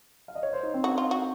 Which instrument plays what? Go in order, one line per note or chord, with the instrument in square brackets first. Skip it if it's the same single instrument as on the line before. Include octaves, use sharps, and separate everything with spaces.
[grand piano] F5
D#5
C#5
C5
D#4
C4
[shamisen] F#4
F4
F#4